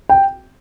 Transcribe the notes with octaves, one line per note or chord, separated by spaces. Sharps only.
G5